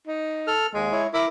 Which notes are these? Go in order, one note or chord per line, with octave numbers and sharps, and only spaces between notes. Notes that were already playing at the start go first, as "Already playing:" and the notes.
D#4
A4 F6
D#2 G#3
E4 C#5
E4 A#4 D6